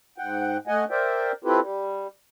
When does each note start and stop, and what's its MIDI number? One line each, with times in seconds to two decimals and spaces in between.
0.18 0.57 44
0.18 0.57 78
0.18 0.57 79
0.67 0.85 57
0.67 0.85 75
0.67 0.85 78
0.67 0.85 80
0.90 1.32 70
0.90 1.32 72
0.90 1.32 74
0.90 1.32 76
0.90 1.32 79
1.44 1.60 60
1.44 1.60 64
1.44 1.60 65
1.44 1.60 67
1.44 1.60 69
1.44 1.60 71
1.60 2.07 55